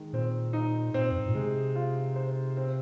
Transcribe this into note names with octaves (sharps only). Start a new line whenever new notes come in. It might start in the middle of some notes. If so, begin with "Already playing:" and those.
Already playing: D#3 G#3
A#2 C4
D#4
A#2 C4
F2
G#2
A#2
C3 G#3
F4
C5
C4